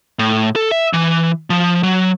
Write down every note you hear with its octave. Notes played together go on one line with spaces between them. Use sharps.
A2
A4
E5
E3
F3
F#3